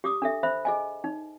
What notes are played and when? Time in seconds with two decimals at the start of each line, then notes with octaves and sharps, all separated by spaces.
0.04 G4 D6 D#6
0.22 D4 A4 E5
0.43 C5 E5 B5
0.65 G#4 D#5 G#5
1.04 D#4